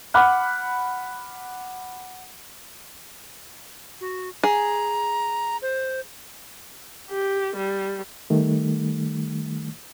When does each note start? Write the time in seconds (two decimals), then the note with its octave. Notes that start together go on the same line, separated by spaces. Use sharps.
0.14 F#5 B5 D6 F6 F#6
4.01 F#4
4.44 G#4 A#5
5.62 C5
7.09 G4
7.56 G3
8.30 D#3 G3 A3